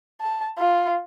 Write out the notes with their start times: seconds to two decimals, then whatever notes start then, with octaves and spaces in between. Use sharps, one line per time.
0.21 A5
0.58 F4